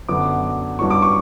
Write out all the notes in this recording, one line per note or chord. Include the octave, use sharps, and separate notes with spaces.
F#2 D3 F#3 B3 D6
G2 F#3 C#4 E4 C#6
D6
C#6